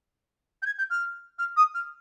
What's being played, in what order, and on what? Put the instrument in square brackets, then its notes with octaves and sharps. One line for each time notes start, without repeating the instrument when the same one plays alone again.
[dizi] G6
G#6
G6
F6
F6
D#6
F6